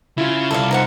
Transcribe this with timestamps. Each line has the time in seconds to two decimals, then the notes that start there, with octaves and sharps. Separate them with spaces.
0.18 C#3 E4 F4
0.51 C2 A4 D5 F5
0.71 D#4 C5 F#5